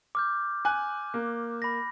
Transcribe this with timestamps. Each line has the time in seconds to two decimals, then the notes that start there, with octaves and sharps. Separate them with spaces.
0.15 D6 F6 G6
0.65 G#5 F#6
1.14 A#3
1.62 B5 A#6